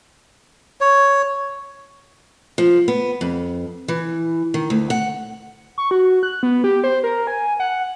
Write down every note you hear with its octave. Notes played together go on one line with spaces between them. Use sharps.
C#5
F3
B3
F2
E3
D#3
D2
F#5
C#6
F#4
F#6
B3
G4
C5
A#4
G#5
F#5